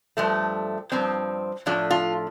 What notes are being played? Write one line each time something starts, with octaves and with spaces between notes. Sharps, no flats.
G2 F3 A3
G2 F3 C4
A2 F3 A3 D4
F4